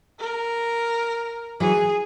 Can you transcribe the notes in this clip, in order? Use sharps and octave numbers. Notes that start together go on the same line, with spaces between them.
A#4
E3 F#3 G#4